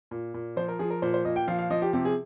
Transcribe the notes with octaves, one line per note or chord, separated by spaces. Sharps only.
A#2
A#2
F3 C5
A#4
F3 G#4
A#4
A#2 C5
C5
A#2 D#5
G5
F3 F5
F5
F3 D#5
G4
C3 G4
G#4